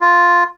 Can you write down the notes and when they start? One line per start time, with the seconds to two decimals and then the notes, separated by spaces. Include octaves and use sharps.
0.01 F4